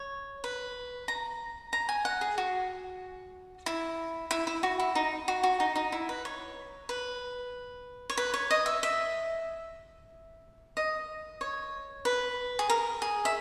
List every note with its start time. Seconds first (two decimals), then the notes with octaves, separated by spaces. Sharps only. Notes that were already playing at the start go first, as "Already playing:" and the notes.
Already playing: C#5
0.44 B4
1.08 A#5
1.73 A#5
1.89 G#5
2.05 F#5
2.21 G#4
2.38 F#4
3.66 E4
4.31 E4
4.47 E4
4.63 F#4
4.80 E4
4.95 D#4
5.28 F#4
5.43 F#4
5.60 D#4
5.76 D#4
5.92 E4
6.09 B4
6.25 C#5
6.89 B4
8.10 C#5
8.17 B4
8.34 C#5
8.51 D#5
8.66 E5
8.83 E5
10.77 D#5
11.41 C#5
12.05 B4
12.59 G#4
12.70 A#4
13.02 G#4
13.25 E5